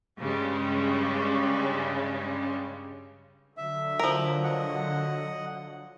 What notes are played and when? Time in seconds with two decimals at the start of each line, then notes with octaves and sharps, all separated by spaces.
0.20 G2 C#3 G3 G#3
3.57 D3 F#3 E5
3.99 F3 A#4
4.44 D#5 F#5